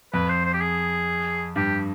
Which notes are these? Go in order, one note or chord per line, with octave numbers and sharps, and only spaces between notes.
F2 B4
C5
C5
G4
G#4
G2 G4